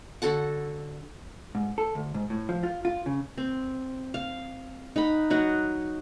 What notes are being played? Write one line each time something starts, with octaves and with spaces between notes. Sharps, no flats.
D3 F#4 A4 F#5
G#2
A4
D2
G#2
A2
F3
F4
F4
C#3
C4
F5
D#4 F#5 B5
F#3 D#4 F#5